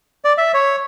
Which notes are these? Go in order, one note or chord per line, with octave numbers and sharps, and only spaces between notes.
D5
E5
C#5